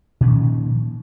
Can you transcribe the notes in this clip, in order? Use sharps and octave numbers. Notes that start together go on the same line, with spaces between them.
A#2 D#3 F3 C#4